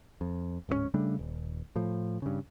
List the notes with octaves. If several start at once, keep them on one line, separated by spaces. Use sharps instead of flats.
F2
D1 G#2 G#3 C#4
C#3 G3 A3 D4
D#1
A2 F3
G2 C#3